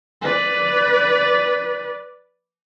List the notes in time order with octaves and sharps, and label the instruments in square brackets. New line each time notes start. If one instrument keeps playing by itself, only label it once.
[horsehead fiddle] B4 D5